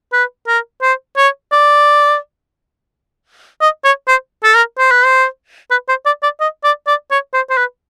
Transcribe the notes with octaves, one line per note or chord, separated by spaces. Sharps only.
B4
A#4
C5
C#5
D5
D#5
C#5
C5
A4
A#4
C5
B4
C5
B4
C5
D5
D5
D#5
D5
D5
C#5
C5
C5
B4